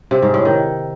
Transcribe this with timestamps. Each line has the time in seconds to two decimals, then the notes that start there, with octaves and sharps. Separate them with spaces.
0.11 C3
0.22 G#2
0.34 A2
0.45 D#3